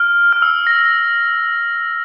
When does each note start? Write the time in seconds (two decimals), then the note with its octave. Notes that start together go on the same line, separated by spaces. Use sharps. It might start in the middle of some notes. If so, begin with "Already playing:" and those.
Already playing: F6
0.33 F6
0.42 E6
0.67 A#6